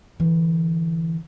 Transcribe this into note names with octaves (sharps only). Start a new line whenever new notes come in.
D3 E3